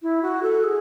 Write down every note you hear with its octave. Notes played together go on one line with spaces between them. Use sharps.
E4
F#4
A4
G#4